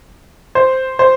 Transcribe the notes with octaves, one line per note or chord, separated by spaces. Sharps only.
C5
C5